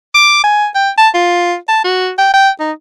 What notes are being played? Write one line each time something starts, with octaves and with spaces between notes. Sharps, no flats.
D6
G#5
G5
A5
F4
A5
F#4
G5
G5
D#4